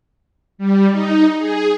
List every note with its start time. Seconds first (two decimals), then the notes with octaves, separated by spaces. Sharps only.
0.58 G3
0.92 D#4
1.39 G#4